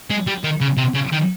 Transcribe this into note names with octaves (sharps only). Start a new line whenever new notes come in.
G#3
G3
D#3
C#3
C3
C#3
D#3